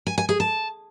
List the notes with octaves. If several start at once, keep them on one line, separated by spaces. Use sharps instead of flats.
G#5
G#5
G#4
A5